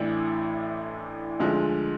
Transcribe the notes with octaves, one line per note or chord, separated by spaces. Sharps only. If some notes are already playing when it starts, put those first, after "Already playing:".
Already playing: A1 A2 E3 D4 E4
D2 D3 F3 G#3